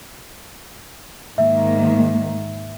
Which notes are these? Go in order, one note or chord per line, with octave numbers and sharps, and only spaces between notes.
G#2 D#3 A#3 E5